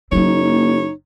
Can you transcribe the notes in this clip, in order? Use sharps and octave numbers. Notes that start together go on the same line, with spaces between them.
F#1 F#3 A#3 D#4 C#5